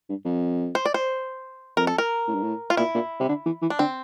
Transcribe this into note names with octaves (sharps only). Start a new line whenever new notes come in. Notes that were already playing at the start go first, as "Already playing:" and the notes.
G2
F2
C5
D5
C5
F2 A#4
A4
A#4
A2
G2
A2
F4
A#2 E4
A#2
C3
D3
E3
E3
D4
D3 C4